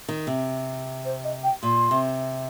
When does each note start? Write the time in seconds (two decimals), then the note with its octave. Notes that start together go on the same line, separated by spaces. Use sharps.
0.09 D#3
0.27 C3
1.04 C5
1.23 D#5
1.43 G5
1.63 A#2 C6
1.91 C3